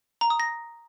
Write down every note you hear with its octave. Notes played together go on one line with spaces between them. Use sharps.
A#5
D#6
A#6